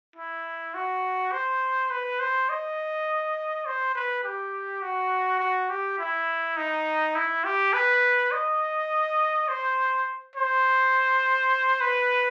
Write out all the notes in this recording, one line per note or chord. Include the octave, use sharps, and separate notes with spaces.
E4
F#4
C5
B4
C5
D#5
C5
B4
G4
F#4
F#4
G4
E4
D#4
E4
G4
B4
D#5
C5
C5
B4